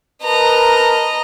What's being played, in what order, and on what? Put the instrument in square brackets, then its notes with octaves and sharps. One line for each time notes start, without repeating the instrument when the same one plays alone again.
[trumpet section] A#4 B4 A5 [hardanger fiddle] D#5 A#5